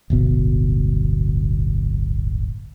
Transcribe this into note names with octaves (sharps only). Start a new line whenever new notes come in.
D1 G1 B2